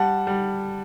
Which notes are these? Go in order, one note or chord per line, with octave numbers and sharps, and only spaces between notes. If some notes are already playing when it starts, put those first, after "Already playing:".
Already playing: G3 F#5 A5
G3